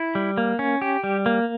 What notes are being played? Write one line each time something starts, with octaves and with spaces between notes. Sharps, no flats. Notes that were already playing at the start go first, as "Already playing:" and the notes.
Already playing: E4
G3
A#3
C#4
G4
G3
A#3